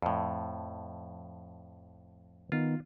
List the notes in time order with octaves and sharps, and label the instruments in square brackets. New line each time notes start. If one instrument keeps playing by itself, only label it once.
[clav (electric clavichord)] F2 A2
[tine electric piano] D#3 B3 D#4 [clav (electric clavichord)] F4